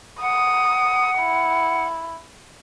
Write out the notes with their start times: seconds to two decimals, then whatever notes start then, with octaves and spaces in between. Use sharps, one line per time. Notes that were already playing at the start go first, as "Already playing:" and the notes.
0.21 F#5 D#6
1.19 E4